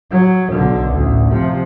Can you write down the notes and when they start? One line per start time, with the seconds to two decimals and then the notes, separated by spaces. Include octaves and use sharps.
0.11 F#3
0.52 B1 D3
0.92 A1 D2
1.28 C3 F3